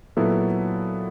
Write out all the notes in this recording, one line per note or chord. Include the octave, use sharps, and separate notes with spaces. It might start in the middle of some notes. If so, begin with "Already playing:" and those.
A#2 F#3 B3 E4 A4